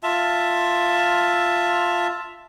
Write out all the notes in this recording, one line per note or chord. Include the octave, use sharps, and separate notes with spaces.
F4 E5 A5